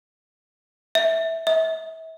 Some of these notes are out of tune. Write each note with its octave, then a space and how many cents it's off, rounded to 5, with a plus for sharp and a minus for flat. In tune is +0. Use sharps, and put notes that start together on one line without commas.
E5 -10
E5 -35